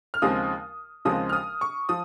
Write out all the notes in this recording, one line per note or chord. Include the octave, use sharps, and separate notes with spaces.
F6
D#2 C#3 F3 G#3 C4 D#6
D#2 C#3 F3 G#3 C4 D#6
F6
D#6
C#6
F3 D#6